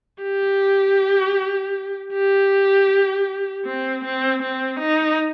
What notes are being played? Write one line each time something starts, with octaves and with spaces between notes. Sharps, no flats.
G4
G4
C4
C4
C4
D#4